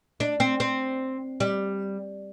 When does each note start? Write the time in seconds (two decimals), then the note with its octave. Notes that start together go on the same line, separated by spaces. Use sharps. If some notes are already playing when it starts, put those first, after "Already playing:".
0.20 D4
0.40 C4
0.60 C4
1.40 G3